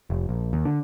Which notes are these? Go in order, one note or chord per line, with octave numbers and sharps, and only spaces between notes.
F1
A#1
D#2
D3